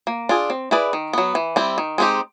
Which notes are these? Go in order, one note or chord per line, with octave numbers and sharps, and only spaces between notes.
A#3
D4 F4 G#4
C4
E4 G#4 B4 D5
D#3
F#3 B3
E3
G3 C4 E4
D#3
G#3 C4 D#4 G4